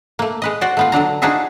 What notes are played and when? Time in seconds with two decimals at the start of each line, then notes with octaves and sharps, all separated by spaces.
0.19 A3 A#3
0.42 G#3 B4 D#5
0.61 F#4 C5 D5
0.77 A3 B3 F4
0.92 D3 F#3 D4 A#5
1.22 D4 D#4 F4 F#4 G#4 E5